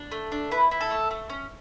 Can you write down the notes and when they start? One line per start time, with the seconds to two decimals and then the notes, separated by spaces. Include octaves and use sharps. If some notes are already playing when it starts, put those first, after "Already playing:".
Already playing: D4
0.11 A3
0.32 D4
0.51 E4 B4
0.71 E4
0.81 A4
0.91 A3
1.11 A3
1.30 C#4